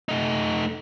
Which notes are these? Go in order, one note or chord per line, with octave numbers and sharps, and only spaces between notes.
A3 D#4